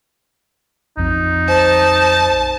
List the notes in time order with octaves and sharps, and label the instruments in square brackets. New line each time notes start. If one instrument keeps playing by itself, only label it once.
[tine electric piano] A#1 F2 [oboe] D#4
[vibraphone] C5 [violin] A5